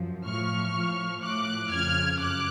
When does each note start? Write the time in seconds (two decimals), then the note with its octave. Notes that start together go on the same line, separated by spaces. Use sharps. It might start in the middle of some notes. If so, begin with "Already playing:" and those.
Already playing: F#2 F3
0.26 A2 F3 C#6 F6
0.74 A2 F3
1.23 A2 F3 D6 F#6
1.70 F2 C#3 F3 F6 G#6
2.20 F#2 D6 F#6